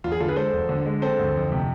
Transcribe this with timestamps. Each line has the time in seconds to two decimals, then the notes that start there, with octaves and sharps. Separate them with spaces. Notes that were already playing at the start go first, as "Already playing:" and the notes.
0.04 E2 F4
0.12 G#4
0.20 D3 F4 A4
0.28 G#4 B4
0.36 G#3 A4 C5
0.53 E1
0.69 D3
0.86 G#3
1.02 C4 A4 C5
1.19 D2
1.35 F2
1.52 C3